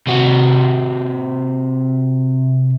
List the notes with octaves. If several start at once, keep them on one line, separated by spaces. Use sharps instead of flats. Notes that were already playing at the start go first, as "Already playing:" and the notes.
C3 F#4